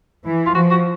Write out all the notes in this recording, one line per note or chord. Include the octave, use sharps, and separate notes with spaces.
E3
F4
F3 F#4
F#4